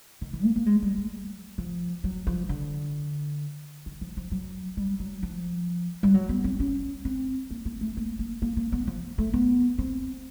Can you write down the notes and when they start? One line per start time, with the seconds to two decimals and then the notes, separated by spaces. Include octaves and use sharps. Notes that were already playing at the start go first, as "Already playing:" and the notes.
0.21 D#3
0.33 E3
0.44 A#3
0.56 A#3
0.66 G#3
0.82 G3
0.97 F#3
1.58 F3
2.04 F#3
2.27 F3
2.49 D3
3.86 D#3
4.01 F3
4.17 F3
4.32 F#3
4.77 G3
5.00 F#3
5.23 F3
6.03 G3
6.14 F#3
6.29 B3
6.44 C4
6.60 C#4
7.05 C4
7.51 A#3
7.66 A#3
7.81 A3
7.97 A#3
8.19 A#3
8.42 A#3
8.57 A#3
8.72 B3
8.87 F3
9.18 A3
9.33 B3
9.78 C4